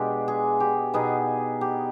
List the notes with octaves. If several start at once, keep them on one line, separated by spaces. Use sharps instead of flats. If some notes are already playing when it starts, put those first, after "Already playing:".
Already playing: B2 G#3 D4 G4
G#4
G4
B2 B3 D#4 G#4
G4